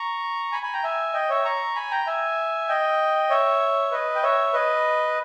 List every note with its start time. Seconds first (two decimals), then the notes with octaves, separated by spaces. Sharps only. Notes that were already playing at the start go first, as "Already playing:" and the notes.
Already playing: A#5 C#6
0.52 G#5 B5
0.63 G#5 B5
0.74 G5 A#5
0.83 E5 G#5
1.14 D#5 G5
1.29 C#5 E5
1.45 A#5 C#6
1.75 G#5 B5
1.91 G5 A#5
2.07 E5 G#5
2.69 D#5 G5
3.30 C#5 E5
3.92 B4 D#5
4.15 G5
4.23 C#5 E5
4.53 B4 D#5